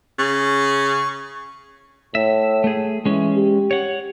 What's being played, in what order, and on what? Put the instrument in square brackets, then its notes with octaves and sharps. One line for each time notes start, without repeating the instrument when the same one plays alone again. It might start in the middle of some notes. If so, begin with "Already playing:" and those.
[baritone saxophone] C#3 [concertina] C#6
[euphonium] A2 [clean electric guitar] E5
[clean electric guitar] A3 G#4
[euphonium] E3 [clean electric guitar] G#3 C#4
[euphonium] G4
[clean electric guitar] C#5 F#5